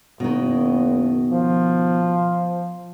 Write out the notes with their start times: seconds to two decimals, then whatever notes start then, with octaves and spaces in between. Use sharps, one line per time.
0.20 F#1 B2 D#3
1.32 F3